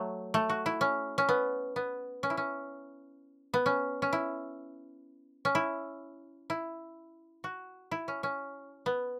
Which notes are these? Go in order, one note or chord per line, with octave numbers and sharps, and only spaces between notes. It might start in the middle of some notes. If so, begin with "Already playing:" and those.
Already playing: F#3 A3
A3
F#4
E4
C#4
C#4
B3
B3
C#4
E4
C#4
B3
C#4
C#4
E4
C#4
E4
E4
F#4
E4
C#4
C#4
B3